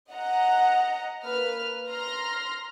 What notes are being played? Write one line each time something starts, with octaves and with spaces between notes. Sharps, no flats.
D#5 F#5 A#5
A#3 B4 F6
A#5 C6 F6 A#6